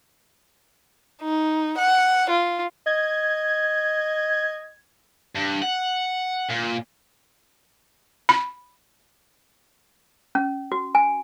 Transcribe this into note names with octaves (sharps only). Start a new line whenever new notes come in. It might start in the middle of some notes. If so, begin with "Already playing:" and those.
D#4
F#5
F4
D#5 G#6
G2
F#5
A#2
B5
C#4
F#4
G#5